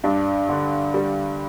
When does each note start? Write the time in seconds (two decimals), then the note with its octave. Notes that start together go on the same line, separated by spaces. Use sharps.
0.04 G2 D4
0.49 D3
0.94 G3